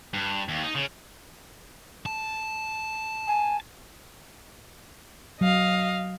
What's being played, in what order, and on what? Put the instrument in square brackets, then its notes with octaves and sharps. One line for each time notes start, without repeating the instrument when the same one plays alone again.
[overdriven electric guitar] G2
D#2
D#4
C#3
[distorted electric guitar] A5
[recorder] G#5
[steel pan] F#3 [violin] D#5 F5